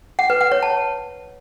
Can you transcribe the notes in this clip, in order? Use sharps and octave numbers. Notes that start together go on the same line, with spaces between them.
F#5
B4
F#5
C#5
A5